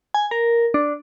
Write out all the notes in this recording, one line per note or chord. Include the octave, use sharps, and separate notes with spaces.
G#5
A#4
D4